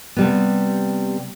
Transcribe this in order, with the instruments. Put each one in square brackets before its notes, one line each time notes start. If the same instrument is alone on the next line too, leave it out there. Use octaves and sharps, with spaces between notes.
[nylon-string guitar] C3 G3 B3